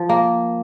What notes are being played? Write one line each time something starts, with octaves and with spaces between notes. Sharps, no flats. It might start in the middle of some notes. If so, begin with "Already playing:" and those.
Already playing: F3
A#3